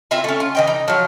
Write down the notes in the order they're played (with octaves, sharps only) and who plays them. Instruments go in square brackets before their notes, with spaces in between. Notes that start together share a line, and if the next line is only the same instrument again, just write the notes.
[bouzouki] C4 F4 E5 G#5
A3 C#4
F4
E3 D#5 G5
D#4
F3 F#3